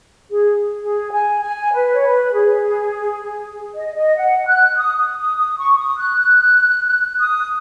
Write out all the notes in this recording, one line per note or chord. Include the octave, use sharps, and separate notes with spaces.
G#4
G#4
G#5
G#5
B4
C#5
B4
G#4
D#5
D#5
F#5
F#6
D#6
D#6
D#6
D#6
C#6
D#6
F#6
D#6